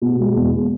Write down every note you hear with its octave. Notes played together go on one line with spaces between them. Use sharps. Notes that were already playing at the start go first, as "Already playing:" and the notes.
B2
G#3
E2